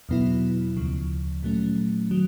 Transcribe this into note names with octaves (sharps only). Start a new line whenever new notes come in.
E2 B2 F#3 B3 E4
D2 C#3 F3
A#2 F#3 A3 C#4
D#3 F#3